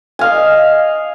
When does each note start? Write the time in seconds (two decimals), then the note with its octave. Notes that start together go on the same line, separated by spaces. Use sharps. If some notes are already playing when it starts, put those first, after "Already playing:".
0.19 D#5 F5 G#5